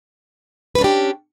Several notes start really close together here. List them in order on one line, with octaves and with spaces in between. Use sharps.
B4 C#4 D4 G4